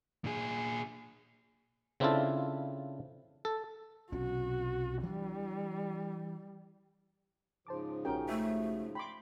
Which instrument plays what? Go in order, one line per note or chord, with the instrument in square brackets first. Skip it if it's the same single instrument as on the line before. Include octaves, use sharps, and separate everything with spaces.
[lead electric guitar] A#2 G#4
[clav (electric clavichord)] C#3 C4 D4 E4 F4 A4
A4
[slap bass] B1 C3 C#4 [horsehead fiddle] F#4
[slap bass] E3 D4 [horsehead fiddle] G3
[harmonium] G#2 C#3 F3 [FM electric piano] C5 A5 D6
[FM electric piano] A#1 F#4 G4 [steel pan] C#4 A#4 G5
[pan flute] A3 [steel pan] E5
[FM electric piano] G5 [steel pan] B5 C6 D6